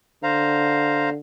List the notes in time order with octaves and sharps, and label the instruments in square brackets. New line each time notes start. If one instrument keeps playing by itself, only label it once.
[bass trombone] D3 [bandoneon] C5 F5 A#5